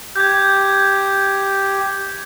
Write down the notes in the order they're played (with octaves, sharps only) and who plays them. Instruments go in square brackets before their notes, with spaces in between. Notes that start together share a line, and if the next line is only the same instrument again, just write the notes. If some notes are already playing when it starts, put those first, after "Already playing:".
[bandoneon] G4 [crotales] G6 G#6